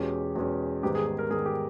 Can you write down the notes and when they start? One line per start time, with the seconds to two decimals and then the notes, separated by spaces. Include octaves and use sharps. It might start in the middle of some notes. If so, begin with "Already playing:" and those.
Already playing: E2 B2 G#3 C#4 G4
0.35 E2 B2 G#3 C#4
0.83 G#2 D#3 G3 B3 G4
0.95 G#4
1.06 G#4
1.18 A#4
1.30 G#2 D#3 G3 B3 G#4
1.46 G4